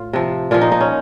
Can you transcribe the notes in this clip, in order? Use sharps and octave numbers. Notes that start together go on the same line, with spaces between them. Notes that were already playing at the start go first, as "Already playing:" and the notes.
Already playing: A2 F4
C3 F3
A#2 F3 F4
D#4
D#4
C#4